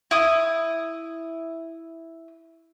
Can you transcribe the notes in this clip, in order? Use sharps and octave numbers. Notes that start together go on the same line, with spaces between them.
E4 D#6